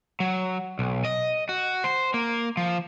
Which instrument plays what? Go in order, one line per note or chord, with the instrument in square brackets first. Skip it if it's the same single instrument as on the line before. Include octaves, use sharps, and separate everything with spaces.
[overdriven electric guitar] F#3
B1
D#5
F#4
C5
A#3
F3